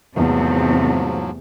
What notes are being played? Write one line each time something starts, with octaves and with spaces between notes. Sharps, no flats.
E2 G#2 C3 F3 F#3 A3